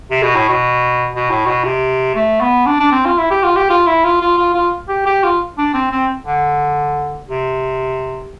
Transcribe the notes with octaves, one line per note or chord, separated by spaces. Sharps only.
C3
B2
A2
B2
B2
A2
B2
C3
A3
B3
D4
D4
C4
F4
E4
G4
F4
G4
F4
E4
F4
F4
F4
F4
G4
G4
F4
D4
C4
C4
D3
C3